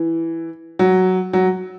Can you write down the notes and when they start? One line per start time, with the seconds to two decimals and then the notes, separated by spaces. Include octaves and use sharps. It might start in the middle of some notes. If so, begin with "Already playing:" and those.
Already playing: E3
0.79 F#3
1.33 F#3